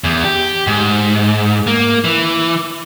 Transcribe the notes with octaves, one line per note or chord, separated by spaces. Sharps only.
E2
G4
G#2
A#3
E3